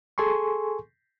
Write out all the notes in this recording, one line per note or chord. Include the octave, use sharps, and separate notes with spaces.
G#4 A4 G#5 C6 C#6